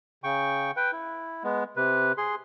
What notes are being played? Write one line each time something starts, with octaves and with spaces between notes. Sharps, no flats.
C#3 G5 C#6
B4 G5
E4
G#3 B3
C3 B4
G#4 C6